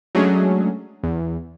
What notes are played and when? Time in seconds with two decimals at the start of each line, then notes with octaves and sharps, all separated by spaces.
0.15 F#3 G#3 A3 C#4 D4 G#4
1.03 E2